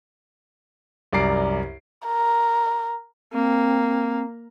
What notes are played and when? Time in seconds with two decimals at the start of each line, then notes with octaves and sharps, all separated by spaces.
1.13 C2 F#2 D5 A#5 C7 D7
2.06 A#4
3.33 A#3 C4